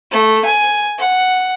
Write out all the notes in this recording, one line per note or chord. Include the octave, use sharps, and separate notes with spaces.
A3
G#5
F#5